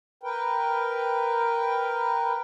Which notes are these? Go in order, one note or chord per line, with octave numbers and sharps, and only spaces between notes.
A#4 B4 G5